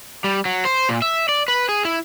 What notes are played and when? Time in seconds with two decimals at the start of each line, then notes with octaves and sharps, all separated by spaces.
0.24 G3
0.45 F#3
0.65 C5
0.89 A#2
1.02 E5
1.29 D5
1.48 B4
1.69 G#4
1.85 E4